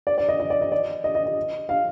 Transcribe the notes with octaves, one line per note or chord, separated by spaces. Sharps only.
D5
D5
D#5
D#5
D5
D#5
D5
D#5
D#5
D#5
F5